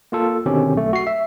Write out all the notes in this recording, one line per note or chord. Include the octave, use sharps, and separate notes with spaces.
A#3 F4 A4
B2 D3 D#3 C4 C#4 G4
B1 A3
F#4 C7
E5